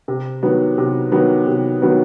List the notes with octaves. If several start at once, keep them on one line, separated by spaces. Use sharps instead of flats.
C3
D#3 F#3 B3
C3
D#3 F#3 B3
C3
D#3 F#3 B3